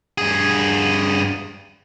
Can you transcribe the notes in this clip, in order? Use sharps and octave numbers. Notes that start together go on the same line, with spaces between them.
G2 G#4